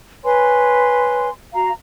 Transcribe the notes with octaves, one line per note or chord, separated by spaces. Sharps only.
B4 C#5 G#5 C6
F#4 F5 A#5